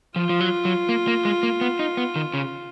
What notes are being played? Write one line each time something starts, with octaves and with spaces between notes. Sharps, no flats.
F3 F4
F3
F#3
F#3
A#3
A#3
G#3
A#3
B3
D#4
B3
D#3
C#3